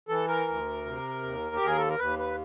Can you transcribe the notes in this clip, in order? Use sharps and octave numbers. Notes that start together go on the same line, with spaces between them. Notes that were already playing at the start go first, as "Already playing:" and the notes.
E3 A4
A#4
D2
C3
D#2
G4
D#2 G#4
A4
A#4
D#2 B4
B4